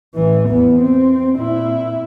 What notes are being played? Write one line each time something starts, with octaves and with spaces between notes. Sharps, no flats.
A1 E3
E2 B3
C4
A#2 E4